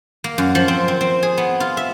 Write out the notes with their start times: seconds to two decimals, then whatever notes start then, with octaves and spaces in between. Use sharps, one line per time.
0.24 A#3
0.38 F#2
0.55 F3
0.68 C4
0.88 C4
1.01 C4
1.23 G#4
1.38 B3
1.60 F4
1.77 E5